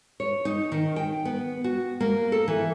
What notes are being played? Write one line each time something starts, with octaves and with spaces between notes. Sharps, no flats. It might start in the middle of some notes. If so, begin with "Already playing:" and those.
C#5
D#4
D#3
G5
B3
F#4
A#3
A4
E3